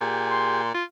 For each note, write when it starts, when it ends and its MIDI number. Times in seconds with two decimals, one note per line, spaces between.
0.01 0.72 46
0.01 0.62 67
0.01 0.62 68
0.30 0.69 84
0.74 0.83 65